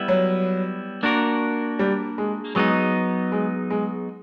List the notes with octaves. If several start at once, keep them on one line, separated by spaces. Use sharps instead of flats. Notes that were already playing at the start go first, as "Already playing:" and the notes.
Already playing: G3 B3 E4
F#3
A#3 D4 F#4 A#4
G3
G#3
F#3 G#3 B3 D#4
G#3
G#3